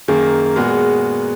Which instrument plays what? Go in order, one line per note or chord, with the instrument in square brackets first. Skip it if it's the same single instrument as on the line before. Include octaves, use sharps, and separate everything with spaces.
[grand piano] F#2 D#3 A#3 [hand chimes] G#4
[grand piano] A#2 G#3 B3 F#4 A#4